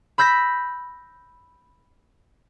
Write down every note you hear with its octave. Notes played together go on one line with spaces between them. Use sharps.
B5 E6 G6 A#6 B6